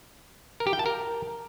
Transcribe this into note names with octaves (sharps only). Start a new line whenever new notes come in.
A#4
G4
G5
A5
A#4